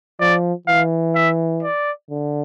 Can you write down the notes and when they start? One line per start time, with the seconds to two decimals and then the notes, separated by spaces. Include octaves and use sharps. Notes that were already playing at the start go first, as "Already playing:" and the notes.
0.20 F3 D5
0.67 E3 F5
1.15 E5
1.63 D5
2.10 D3